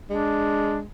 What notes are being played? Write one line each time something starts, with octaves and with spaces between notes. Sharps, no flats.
G#3 D4